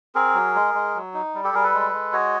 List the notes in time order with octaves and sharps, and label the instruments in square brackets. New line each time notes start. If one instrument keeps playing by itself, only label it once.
[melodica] C4 G#4 A#4
F#3
G#3
G#3
F#3
D#4
G3
G4 A4
G3 G#4 A#4
A4 B4
G#3
G#3
F#4 C#5 D#5